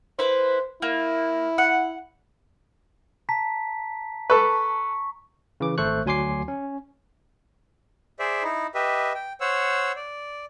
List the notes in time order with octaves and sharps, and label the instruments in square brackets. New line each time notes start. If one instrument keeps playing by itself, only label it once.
[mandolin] E4 B4 [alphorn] C5
[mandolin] A#3 [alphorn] E4
[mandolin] F#5
[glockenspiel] A5 A#5 B6
[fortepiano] A4 B4 [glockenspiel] C#6
[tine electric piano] C#3 E3 D6
G#1 A3 A4 C5 C#6 F#6
D2 F#3 G#5 C6 D6 C7
C#4
[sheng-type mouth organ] G#4 C5 D5 E5
D#4 E4
G4 B4 D#5 E5
G5
C5 C#5 F#5 E6
D5